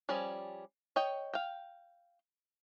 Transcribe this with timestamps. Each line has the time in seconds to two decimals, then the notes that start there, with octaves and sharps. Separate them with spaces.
0.09 F3 G3 C#4 G#4 D5
0.96 C#5 D#5 G5
1.33 F5 G5